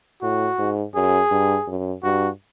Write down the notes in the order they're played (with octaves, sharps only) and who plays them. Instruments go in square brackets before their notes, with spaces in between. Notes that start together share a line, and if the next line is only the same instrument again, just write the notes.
[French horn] A2 [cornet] F#4
[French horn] G#2
[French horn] F#2 [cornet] G#4
[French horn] G2
F#2
[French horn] G2 [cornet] F#4